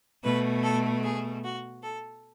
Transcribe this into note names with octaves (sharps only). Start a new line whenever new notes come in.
B2 A3 B4
A4
G#4
F#4
A4